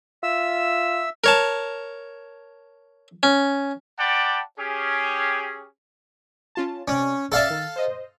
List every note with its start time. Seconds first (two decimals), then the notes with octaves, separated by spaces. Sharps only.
0.23 F4 E5 E6
1.24 A#4 C#5 A5
3.23 C#4
3.99 D5 F#5 G5 A5 B5 D6
4.58 C#4 G4 G#4
6.55 C#4 F4 A5
6.88 C3 C#4 D5
7.32 C#4 A4 D5 E5 F5 A5
7.50 D#3
7.76 C5 D#5